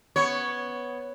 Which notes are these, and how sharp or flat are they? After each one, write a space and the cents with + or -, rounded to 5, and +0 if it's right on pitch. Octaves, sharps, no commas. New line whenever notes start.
B3 +0 C#5 +0